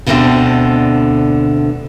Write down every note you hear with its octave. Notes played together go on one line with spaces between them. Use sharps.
D2 B2 D3 C4 D4 E5